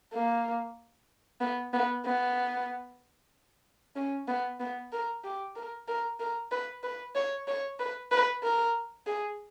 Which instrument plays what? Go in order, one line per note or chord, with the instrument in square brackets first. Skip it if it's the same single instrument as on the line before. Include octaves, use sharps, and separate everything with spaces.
[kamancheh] A#3
B3
B3
B3
C#4
B3
B3
A#4
G4
A#4
A#4
A#4
B4
B4
C#5
C#5
B4
B4
A#4
G#4